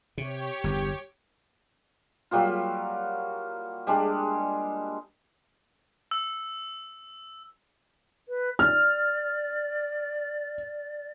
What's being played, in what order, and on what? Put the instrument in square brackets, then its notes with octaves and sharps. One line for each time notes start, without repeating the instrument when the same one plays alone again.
[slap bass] C3 [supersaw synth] G4 C#5
[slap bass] G1 E2
[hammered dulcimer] F#3 G3 A#3 F4
G3 G#3 D4
[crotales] E6
[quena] B4
[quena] D5 [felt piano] F6